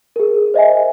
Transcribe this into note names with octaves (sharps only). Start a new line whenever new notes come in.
G#4 A#4
C5 D#5 E5 G#5